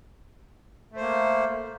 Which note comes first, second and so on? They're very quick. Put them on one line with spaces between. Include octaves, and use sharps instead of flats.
A3 C5 A#3